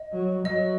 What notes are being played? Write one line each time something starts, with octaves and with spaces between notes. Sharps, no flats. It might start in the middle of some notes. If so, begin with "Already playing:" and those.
Already playing: D#5
F#3
F#3 D#5